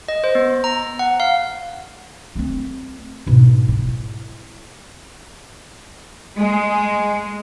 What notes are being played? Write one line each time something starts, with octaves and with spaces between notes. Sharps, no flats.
D#5
C5
B3
A#5
F#5
F5
A3 C4
G#2 B2
E4
G#3